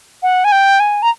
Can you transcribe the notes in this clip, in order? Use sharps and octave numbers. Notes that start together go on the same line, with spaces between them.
F#5
G#5
G5
G#5
A#5